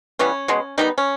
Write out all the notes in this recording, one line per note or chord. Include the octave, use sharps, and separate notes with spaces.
E3 G3 B3 C#4
B2 G#3 B3
D#3 G3 B3 D#4
C#4